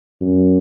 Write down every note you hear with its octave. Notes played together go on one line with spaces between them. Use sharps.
F#2